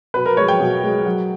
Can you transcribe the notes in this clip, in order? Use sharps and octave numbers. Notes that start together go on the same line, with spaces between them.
B2 B4
A#4
G#3 C#5
G5
B2
G#3
F#3